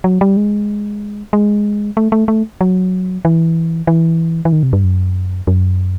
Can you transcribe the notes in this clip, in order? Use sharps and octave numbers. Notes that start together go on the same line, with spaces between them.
F#3
G3
G#3
G#3
A3
A3
A3
F#3
E3
E3
E3
D#3
C3
G2
F#2
F#2